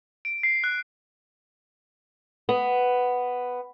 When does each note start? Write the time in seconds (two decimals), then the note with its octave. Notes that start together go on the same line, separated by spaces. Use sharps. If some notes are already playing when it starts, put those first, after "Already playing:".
0.25 D7
0.43 C7
0.64 F#6
2.49 B3